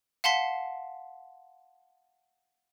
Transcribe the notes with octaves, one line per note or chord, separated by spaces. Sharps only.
F5 F#5 A5 C6 B6 C7